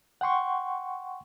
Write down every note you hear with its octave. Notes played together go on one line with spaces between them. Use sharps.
F#5 G5 C6 C#6